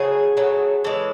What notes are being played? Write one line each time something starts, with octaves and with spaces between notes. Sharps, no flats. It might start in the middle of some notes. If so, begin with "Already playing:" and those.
Already playing: C#3 F#3 A3 G#4
C#3 F#3 A3
C#3 E3 G#3 A4